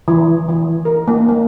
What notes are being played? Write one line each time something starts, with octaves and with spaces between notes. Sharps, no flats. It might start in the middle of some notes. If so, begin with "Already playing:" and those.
E3
E3
A#4
A#3
A#3